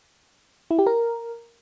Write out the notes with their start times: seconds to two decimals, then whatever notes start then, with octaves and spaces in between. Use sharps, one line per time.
0.71 E4
0.79 G4
0.87 A#4